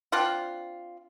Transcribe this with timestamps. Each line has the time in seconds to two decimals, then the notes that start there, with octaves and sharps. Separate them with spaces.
0.12 C4 D4 F4 F#5